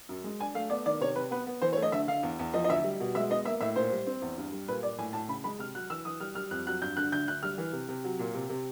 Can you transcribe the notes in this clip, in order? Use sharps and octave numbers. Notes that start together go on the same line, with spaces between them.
F#2
G#3
D4 G#5
A3 F5
B3 D5
D#3 D5
C3 C#5
C3 B4
B3 B4
B3
E3 C5
C#5
A3
D#5
D3 E5
D3 F5
E2
E2
F3 D#5
D#5
D2 E5
G3
B2
G#3 E5
B3 D#5
A#3 E5
A2 E5
A#2 C5
G3
C4
E2
G2
G3
A#2 B4
A#2 D5
A2 G#5
A2 A5
C#3 B5
G#3 B5
C3 F6
F#3 F#6
E3 E6
E3 D#6
G3 F6
G3 F6
F2 F#6
F#3 F#6
G2 G6
D3 F#6
D2 G6
D2 F#6
G3 F6
E3
C3
C3
F#3
A#2
C3
C3